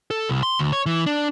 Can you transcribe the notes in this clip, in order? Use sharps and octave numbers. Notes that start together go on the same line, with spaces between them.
A4
C2
C6
D2
C#5
E3
D4